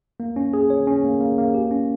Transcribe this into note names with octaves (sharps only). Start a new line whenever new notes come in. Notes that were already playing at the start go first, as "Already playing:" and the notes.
A#3
C#4
G#4
C#5
C#4
A#3
A#3
A#3
G4
C#4